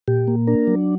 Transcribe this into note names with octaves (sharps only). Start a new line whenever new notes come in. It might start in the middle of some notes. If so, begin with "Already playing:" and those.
A#2 G4
A#3
D4 A#4
F#3